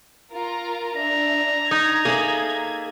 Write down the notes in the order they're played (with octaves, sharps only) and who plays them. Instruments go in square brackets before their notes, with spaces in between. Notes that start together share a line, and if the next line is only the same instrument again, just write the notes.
[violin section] F4 A#4 A#5
[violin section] D4 E5 [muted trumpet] A#5
[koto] D#4 [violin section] G#6
[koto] A#3 [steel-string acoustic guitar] G#4 A4 E5